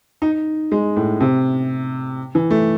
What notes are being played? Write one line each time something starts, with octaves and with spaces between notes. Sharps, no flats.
D#4
G#3
A2
C3
E3
A3